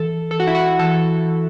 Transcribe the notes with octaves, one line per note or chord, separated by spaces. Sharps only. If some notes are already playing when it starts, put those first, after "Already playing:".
Already playing: E3 A4
E3 A4
F#4
E4
F#4
E3 A4
E3